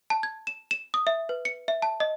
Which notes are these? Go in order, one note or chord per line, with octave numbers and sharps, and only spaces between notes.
A5
G#6
E7
E7
D#6
E5
B4
C#7
E5
A5
D#5